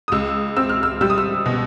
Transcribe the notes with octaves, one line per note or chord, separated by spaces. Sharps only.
D#6
C#2 E6
C4 E6
F6
E6
G3 E6
D#6
E6
B2